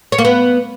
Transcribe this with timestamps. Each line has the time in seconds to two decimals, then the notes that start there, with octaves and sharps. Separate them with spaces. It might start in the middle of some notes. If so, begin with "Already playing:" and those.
0.12 C#5
0.18 A#3
0.25 B3